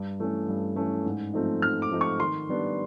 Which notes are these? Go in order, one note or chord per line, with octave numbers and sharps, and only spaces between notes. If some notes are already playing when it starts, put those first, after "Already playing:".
Already playing: G2
E3 A3 C#4
G2
E3 A3 C#4
G#2
F3 A3 C4 D#4
G#2 F6
D6
F3 A3 C4 D#4
C#6
D#3 C6
G3 B3 D4